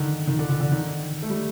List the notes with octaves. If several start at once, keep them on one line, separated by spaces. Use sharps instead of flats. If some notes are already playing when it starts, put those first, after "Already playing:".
Already playing: D3 D#3
D#3
D3
D3
D3
D#3
A3
G3